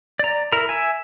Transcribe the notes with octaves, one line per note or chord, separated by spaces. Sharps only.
D5 A#5
E4 A#4 A#5
E5 G#5